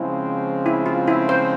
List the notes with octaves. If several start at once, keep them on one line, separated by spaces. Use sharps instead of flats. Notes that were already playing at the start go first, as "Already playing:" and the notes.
Already playing: C#3 F3 G#3 C4 E4
E4
F4
E4
C5